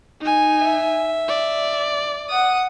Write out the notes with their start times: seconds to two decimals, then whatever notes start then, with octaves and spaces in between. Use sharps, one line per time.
0.21 D#4 G#5
0.61 E5
1.29 D5
2.30 F#5 D#6